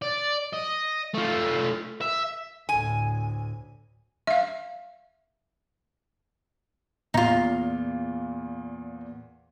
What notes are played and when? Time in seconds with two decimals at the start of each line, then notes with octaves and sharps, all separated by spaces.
0.02 D5
0.54 D#5
1.14 A3 F4
2.01 E5
2.69 D2 A2 G#5
4.27 E5 F5
7.14 E2 A#2 D#4 F4